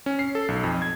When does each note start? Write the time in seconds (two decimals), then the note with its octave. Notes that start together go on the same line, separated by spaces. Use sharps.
0.06 C#4
0.19 C7
0.35 A4
0.48 B1
0.64 F2
0.82 G#6